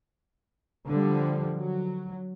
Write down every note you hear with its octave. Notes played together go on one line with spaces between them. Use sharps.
D3 F3 G3
F#3